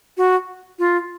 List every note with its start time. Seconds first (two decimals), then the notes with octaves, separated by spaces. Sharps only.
0.17 F#4
0.79 F4